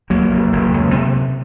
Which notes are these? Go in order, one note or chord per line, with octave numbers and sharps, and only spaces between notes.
D#2 F#3 A#3
F1
F1
C#2
C3